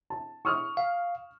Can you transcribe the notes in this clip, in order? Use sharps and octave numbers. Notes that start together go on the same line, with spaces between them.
A5
C#6 D#6 F6
F5